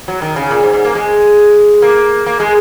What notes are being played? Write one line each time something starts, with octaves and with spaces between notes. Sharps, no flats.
F#3
D#3
C#3
A#2
G#2
G#2
A#3
G#3
A#3
A#3
G#3